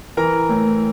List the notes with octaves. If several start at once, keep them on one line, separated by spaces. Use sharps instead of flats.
E3 A#4 A#5
A2